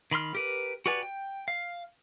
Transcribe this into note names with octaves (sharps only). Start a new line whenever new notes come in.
D#3 B5 C6 F6
G4 A#4 B4
F#4 G4 B4 D5 G#5
G5
F5